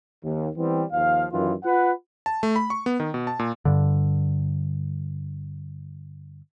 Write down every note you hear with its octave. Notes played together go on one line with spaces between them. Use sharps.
D#2
E3 G3 B3 C4
D#2 F3 F5
F#2 D#3 E3 F4
F4 B4 F#5
A5
A3
B5
C#6
B3
D#3
B2
A5
A#2
G2 D3